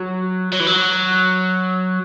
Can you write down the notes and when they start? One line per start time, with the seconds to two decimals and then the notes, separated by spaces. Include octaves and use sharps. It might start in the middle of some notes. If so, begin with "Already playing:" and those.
Already playing: F#3
0.52 F#3
0.60 E3
0.67 F#3